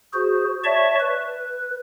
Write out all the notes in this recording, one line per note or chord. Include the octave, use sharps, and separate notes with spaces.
F#4 G#4 C5
C#5 D5 E5 A5 C#6
B4